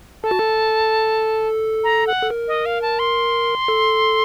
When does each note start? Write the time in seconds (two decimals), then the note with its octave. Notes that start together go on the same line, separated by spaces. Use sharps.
0.23 A4 A5
0.31 F#4
0.39 A4
1.84 A#5
2.07 F#5
2.23 A4
2.30 A#4
2.48 D#5
2.66 F5
2.82 A5
2.99 C6
3.68 A4